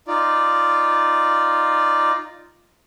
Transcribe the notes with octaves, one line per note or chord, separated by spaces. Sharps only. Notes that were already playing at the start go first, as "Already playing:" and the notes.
D#4 F4 D5